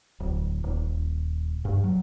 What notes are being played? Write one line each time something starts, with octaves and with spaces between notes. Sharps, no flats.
D1
D#1
G2
F#3